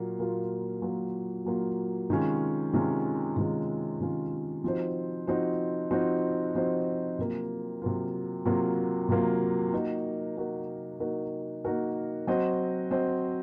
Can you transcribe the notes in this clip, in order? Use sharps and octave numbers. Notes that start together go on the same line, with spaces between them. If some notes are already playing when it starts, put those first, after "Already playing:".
Already playing: A#2 F#3 A#3 F4
A#2 F#3 A#3 F4
A#2 F#3 A#3 F4
A#2 F#3 A#3 F4
C3 D#3 G#3 C#4 F4
C3 D#3 G#3 C#4 F4
C3 D#3 G#3 C#4 F4
C3 D#3 G#3 C#4 F4
F3 C4 D#4 F#4 C5
F3 C4 D#4 F#4 C5
F3 C4 D#4 F#4 C5
F3 C4 D#4 F#4 C5
C3 F#3 A#3 F4
C3 F#3 A#3 F4
C3 F#3 A#3 F4
C3 F#3 A#3 F4
A#3 D#4 F#4 A#4
A#3 D#4 F#4 A#4
A#3 D#4 F#4 A#4
A#3 D#4 F#4 A#4
F#3 C4 F#4 C5 D#5
F#3 C4 F#4 C5 D#5